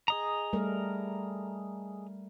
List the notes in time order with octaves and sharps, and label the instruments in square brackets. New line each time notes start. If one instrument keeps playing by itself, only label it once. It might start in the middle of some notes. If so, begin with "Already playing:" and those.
[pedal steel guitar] G#4 D#5 A#5
[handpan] G3 A3 A#4